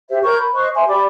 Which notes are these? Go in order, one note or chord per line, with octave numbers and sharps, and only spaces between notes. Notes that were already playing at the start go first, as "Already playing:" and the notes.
G4 C5 E5
A#4 C#5 C#6 G6
B5
C5 D#5 C#6 F#6
C5 E5 G#5 C6
G4 D5 B5 D6